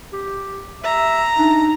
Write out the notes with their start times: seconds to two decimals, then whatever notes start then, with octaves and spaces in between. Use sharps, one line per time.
0.13 G4
0.84 E5 A#5
1.37 D4 D#4